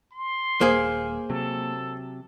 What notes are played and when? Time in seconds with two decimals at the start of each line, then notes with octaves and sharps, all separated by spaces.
0.12 C6
0.61 D#1 A#3 G#4 C5
1.30 C3 F#3 A4